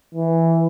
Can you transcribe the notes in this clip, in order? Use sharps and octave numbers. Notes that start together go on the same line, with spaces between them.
E3